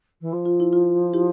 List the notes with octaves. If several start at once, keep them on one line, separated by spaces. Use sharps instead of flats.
E3
F3
F4
E4
F4
E4 G4